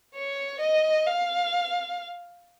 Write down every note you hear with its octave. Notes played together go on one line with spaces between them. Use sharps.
C#5
D#5
F5